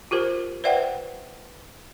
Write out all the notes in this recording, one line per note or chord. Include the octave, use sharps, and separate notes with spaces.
F4 G4 A#4 C5
B4 C5 D5 E5 F#5 G5